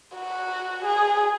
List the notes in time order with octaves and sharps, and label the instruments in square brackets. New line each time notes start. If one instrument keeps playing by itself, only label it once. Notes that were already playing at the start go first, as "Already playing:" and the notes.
[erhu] F#4
G#4